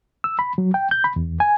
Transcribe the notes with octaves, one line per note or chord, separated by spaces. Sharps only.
E6
B5
F#3
G5
G6
B5
E2
G#5